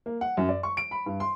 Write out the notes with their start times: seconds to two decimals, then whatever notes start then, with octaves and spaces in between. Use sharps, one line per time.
0.06 A#3
0.21 F#5
0.37 F#2
0.49 D5
0.63 C#6
0.77 D7
0.91 B5
1.06 G2
1.20 C6